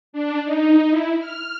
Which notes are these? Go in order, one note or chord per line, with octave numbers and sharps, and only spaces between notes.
D4
D#4
E4
F6